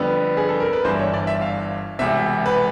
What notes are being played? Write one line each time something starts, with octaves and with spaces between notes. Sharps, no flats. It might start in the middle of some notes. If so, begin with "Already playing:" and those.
Already playing: F2 D3 G3 B3
G#4
A4
A#4
B4
G1 G2 E3 C5
C#5
D5
E5
F5
E1 E2 C3 E5
B4